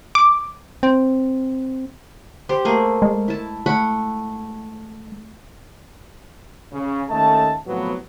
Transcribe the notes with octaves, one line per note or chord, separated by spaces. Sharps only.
D6
C4
G4 C5
A3 A#3 G#4
G#3
E4 A5
A3 F#5 B5
C#3
D#2 A3 C#4 A4 D#5 A5
A2 C3 F3 F#3 B3